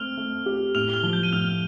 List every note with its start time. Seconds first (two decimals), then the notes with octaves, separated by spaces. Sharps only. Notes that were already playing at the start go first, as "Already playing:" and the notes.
Already playing: A3 C4 F6 F7
0.17 A3
0.46 G4
0.75 A2 F6 F7
0.90 G7
0.94 F6 F7
1.03 F3
1.13 G6 G7
1.23 D#7
1.32 A2 F6 F7